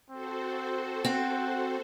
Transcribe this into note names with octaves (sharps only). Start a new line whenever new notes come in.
C4 F#4 A4 C5
C4 F#5